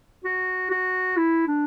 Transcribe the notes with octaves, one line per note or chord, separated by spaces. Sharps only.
F#4
F#4
E4
D4